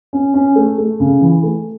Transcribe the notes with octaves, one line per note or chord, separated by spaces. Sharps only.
C#4
C#4
A3
A3
C#3
E3
A3